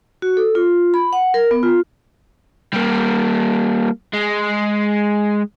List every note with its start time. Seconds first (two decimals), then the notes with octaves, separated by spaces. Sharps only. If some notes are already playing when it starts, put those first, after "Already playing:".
0.22 F#4
0.37 A4
0.55 F4
0.94 B5
1.13 F#5
1.34 A#4
1.51 B3
1.63 F4
2.73 G3 A#3
4.13 G#3